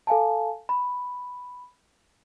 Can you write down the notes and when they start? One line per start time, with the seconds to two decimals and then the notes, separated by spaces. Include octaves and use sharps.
0.07 A4 F5 G#5 A5
0.69 B5